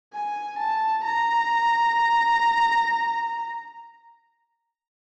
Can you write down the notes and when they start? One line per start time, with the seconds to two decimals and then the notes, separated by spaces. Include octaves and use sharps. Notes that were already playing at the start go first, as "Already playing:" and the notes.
0.13 G#5
0.58 A5
1.04 A#5